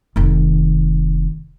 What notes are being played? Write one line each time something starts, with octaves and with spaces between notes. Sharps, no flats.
F1 D#3